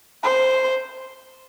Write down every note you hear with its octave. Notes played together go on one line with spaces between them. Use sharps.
C5